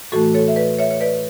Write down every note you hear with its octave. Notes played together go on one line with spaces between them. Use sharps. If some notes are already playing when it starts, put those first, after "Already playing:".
A2 E3 A3 F#4 A4
A4 C#5
E5
B4 D5
C#5 E5
C#5
B4 D5